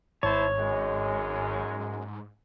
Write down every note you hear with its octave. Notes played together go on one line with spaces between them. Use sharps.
G#1 G#2 E4 C5 C#5 A5
F#2 G#3